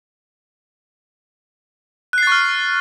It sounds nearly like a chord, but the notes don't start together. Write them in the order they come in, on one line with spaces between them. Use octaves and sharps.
F#6 C7 A6 C#6 F6